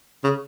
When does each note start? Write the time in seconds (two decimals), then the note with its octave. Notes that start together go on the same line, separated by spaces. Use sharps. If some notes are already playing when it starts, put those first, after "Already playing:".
0.24 C#3